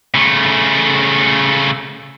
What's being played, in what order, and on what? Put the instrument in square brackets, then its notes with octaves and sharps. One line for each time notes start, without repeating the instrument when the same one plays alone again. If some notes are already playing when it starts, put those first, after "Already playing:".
[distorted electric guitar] C#3 A3